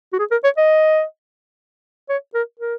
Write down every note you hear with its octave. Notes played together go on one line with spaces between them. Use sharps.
F#4
G#4
A#4
C#5
D#5
C#5
A#4
A#4